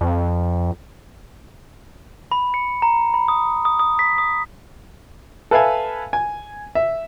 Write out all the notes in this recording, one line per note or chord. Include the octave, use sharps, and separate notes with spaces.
F2
B5
C#7
A#5
B5
D#6
D#6
D#6
B6
D#6
A4 B4 E5 F5 G#5
G#5
E5